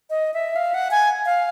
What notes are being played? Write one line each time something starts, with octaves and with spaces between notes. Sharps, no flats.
D#5
E5
F5
F#5
G#5
F5